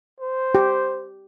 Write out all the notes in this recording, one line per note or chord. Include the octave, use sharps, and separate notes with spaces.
C5
G4